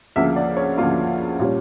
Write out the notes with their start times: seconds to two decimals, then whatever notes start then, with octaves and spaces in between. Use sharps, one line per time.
0.16 D2 C#3 F3 A#3 E5
0.36 D5
0.57 C#5
0.78 D2 C#3 F3 A#3 F4
1.39 A#2 G3 C#4